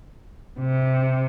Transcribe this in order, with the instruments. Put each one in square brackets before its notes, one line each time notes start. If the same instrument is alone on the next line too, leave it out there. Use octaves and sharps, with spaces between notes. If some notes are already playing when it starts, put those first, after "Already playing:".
[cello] C3